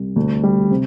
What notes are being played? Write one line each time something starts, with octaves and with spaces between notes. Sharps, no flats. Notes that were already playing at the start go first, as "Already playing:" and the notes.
Already playing: C2 G3
D2
G3
C3